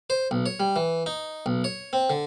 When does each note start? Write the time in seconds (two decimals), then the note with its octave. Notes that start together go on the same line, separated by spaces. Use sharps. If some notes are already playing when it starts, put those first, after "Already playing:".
0.10 C5
0.31 B1
0.46 C#5
0.60 G3
0.76 E3
1.06 D#4
1.46 B1
1.64 C#5
1.93 C4
2.10 D3